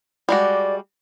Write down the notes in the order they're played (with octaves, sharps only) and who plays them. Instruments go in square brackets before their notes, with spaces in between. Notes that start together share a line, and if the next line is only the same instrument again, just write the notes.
[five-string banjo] G3 G#3 F#4 [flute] D5